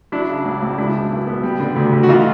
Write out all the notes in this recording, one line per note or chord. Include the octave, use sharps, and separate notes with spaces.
F#3 D4 E4
C#3
C#2
C#2
G#3 D4 E4
B2
B1
B3
G3
D3
D2
D2
F#4
E3 D#4 F4